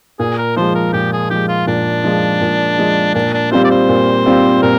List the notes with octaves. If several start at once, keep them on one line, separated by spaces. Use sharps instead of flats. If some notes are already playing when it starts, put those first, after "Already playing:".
A#2 G#4
A#4
F3 G#3 C5
A#4
A#2 G4
G#4
F3 G#3 G4
F4
A#2 D4
F3 G#3
A#2
F3 G#3
A#2 D4
D4
G3 C4 F4 C5
D5
C5
A#2
G3 C4 F4
A#2 A#4